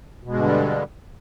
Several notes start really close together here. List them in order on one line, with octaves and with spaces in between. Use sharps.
B2 G#3 G2 D3 G3